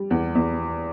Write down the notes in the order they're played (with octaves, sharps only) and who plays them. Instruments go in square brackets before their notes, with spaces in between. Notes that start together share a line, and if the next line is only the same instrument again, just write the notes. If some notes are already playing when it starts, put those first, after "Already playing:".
Already playing: [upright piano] G3
E2
E2